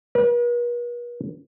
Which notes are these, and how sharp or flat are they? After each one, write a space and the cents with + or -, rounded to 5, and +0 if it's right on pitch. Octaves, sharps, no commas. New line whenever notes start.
B4 -45